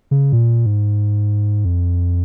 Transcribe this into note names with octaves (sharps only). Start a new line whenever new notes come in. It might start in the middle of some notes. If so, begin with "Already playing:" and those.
C#3
A#2
G#2
F2